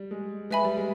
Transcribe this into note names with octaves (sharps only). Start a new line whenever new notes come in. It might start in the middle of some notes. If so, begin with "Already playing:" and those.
Already playing: G3
G#3
G#3 B4 E5 G#5 B5
G3
G#3